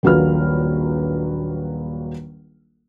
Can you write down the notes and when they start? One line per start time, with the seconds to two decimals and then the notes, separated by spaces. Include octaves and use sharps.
0.03 D#1 A#1 F#3 A#3 B4 F6